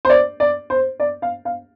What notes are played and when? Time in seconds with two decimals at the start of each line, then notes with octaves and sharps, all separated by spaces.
0.05 C5
0.09 D5
0.40 D5
0.70 C5
1.00 D5
1.22 F5
1.45 F5